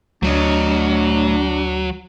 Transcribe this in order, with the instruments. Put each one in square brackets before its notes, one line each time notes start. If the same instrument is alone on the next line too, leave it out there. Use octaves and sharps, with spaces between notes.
[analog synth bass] D2 [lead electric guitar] F#3 [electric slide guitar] A3 C#5 D#5 [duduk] D4